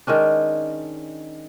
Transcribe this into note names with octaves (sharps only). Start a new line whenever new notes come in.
D#3 G#3 C#4 D4